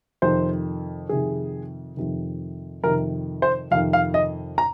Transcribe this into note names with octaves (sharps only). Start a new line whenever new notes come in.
F2 C3 D#3 C5
F2 C3 D#3 G#4
F2 C3 D#3
F2 C3 D#3 A#4
C5
F2 C3 D#3 F5
F5
D#5
A#5